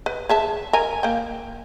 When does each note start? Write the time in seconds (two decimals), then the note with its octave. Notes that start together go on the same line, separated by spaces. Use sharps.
0.06 B4
0.29 G#4 E5 A5
0.73 A#4 G#5
1.03 A#3 G5